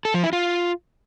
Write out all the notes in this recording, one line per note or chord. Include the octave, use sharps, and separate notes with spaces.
A4
F3
E4
F4